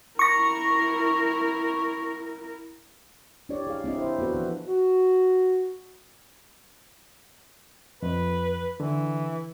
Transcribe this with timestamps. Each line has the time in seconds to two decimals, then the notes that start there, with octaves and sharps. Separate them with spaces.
0.19 E4 A#4 C#6 A#6
3.49 D4 E4 G4 C#5 D5
3.67 G#4 F5
3.84 C4 D4 E4 D#5
3.98 C5 E5
4.19 B3 F#4 A4 B4
4.35 E3 F3
4.65 F#4
8.03 F2 B4
8.80 D3 E3